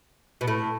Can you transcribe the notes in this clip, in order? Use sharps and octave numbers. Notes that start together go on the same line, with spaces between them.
B2
A2